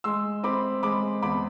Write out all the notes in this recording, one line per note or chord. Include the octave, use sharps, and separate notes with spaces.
G#3 C6 E6
C4 B5 D6
G#3 B5 D6
E2 B5 D6